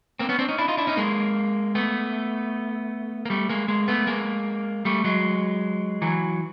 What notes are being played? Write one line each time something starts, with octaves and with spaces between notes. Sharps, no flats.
A#3 C4
B3 C#4
C4 D4
C#4 D#4
D4 E4
D#4 F4
D4 E4
C#4 D#4
G#3 A#3
A3 B3
A#3
G3 A3
G#3 A#3
G#3 A#3
A3 B3
G#3 A#3
G3 A3
F#3 G#3
E3 F#3